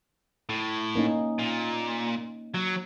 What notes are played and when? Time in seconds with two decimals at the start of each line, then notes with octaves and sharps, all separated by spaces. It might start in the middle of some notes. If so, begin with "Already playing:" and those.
0.49 A2
0.95 A#3 C#4 D#4
1.39 A#2
2.54 F#3